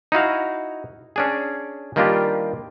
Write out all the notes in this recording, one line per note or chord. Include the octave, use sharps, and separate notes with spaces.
D#4 E4 F#4 F5
C#4 D4 G#4
D#3 G3 A#3 D4 F4 G4